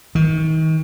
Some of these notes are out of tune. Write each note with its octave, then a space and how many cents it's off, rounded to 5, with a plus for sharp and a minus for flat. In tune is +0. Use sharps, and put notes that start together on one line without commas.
D#3 +35